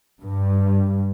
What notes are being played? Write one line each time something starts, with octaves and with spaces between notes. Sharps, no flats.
G2